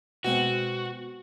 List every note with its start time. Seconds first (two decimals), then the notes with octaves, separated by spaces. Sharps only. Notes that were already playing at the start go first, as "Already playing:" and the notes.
0.25 B2 G#3 C4 F#4